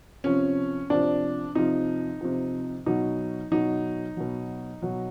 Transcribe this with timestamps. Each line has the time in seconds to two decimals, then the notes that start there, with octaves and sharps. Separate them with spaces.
0.24 C3 F3 C#4
0.90 C3 F3 D4
1.55 C3 F3 D#4
2.21 C3 F3
2.86 B2 F#3 D#4
3.52 B2 F#3 D#4
4.17 B2 F#3
4.82 B2 F#3